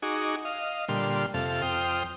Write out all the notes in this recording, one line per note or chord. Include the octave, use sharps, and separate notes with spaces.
D#4 F#4 G#4 C#6 D6
D#5 F5
A#2 D3 G3 C6 F6
F2 C3 A4 F5
F2 C5 G5 D#6 F6